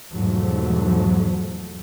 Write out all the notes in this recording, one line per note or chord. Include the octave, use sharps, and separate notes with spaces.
E2 G#2 B2 F3 F#3 A3